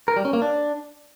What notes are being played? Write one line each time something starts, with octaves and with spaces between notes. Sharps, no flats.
A#4
G3
C#4
A#3
D4